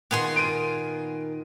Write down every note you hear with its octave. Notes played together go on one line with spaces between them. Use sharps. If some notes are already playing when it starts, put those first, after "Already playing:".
A#2 D#3 B3 G#4 C6
A#4 D7 D#7